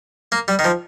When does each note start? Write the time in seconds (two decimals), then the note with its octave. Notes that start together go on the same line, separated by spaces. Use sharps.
0.32 A#3
0.48 G3
0.59 D#3
0.64 F3